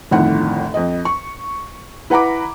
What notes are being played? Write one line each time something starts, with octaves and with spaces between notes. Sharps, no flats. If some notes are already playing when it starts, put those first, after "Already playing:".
G1 F2 A2 D#3 F#5
F2 D#5
C#6
E4 B4 F#5 A#5 B5 D6